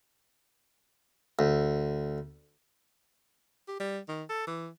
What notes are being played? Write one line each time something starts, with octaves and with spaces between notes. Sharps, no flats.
D2
G4
G3
D#3
A4
E3